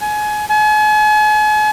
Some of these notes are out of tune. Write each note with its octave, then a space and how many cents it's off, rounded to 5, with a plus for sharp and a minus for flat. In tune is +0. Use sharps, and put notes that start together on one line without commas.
G#5 +25
G#5 +40